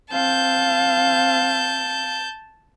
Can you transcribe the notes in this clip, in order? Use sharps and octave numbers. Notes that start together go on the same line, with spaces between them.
C4 F5 A5 G6